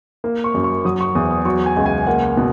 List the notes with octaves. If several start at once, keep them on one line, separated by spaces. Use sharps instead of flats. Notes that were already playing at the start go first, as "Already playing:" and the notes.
A#3
C#6
F#2
C#6
F#3 D#6
C#6
E2 D#6
D#6
F#3 C#6
G#5
C#2
G#5
A#3 F#5
B2 F#5